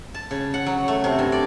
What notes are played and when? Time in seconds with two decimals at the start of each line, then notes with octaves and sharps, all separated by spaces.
0.14 A5
0.31 C#3
0.54 F#5
0.66 F#3
0.88 A3
1.04 C3
1.19 G2
1.32 D5